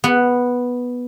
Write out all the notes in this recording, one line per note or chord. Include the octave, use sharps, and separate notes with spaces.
B3